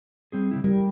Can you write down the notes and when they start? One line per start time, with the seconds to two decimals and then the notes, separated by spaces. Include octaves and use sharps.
0.32 G3 C4 G#4
0.51 C#3 G3 E4
0.64 G3 A#4